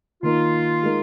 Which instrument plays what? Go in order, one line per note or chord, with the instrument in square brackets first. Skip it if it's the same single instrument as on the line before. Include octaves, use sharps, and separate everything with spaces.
[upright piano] D#3 A#3 D#4 A#4 [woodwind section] F4
[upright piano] G#3 D#4 A#4